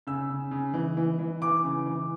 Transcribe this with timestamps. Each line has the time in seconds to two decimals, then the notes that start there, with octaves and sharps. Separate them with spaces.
0.07 C#3 E6
0.30 C#3
0.51 C#3
0.74 E3
0.97 E3
1.19 E3
1.42 E3 D6
1.64 C#3
1.86 E3